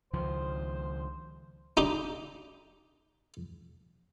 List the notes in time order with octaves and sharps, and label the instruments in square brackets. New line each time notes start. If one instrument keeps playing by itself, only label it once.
[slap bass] C#2 D#3 F3 [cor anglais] C5
[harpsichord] D4 D#4 G4